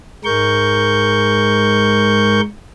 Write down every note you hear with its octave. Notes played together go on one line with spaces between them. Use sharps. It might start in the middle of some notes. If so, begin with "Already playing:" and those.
G#2 G#3 A#4 C#6 G6